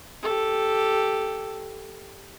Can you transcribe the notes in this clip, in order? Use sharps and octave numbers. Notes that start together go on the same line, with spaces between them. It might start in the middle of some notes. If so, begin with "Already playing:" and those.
G4 A4